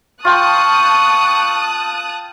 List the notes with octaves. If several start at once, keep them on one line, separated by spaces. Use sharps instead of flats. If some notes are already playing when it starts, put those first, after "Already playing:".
F4 G5 A5 C#6 D#6 F#6